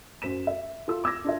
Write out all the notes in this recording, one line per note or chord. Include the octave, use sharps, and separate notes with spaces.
F#2 C5 B6 E7
E5
F4 A4 E6
D6 E6 G#6 A#6
D4 F4 E5